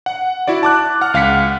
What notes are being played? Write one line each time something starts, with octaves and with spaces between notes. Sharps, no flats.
F#5
E4 F#4 D5
A5 D6 F#6
F#5 F6
C#2 F5 F#5 B6 C#7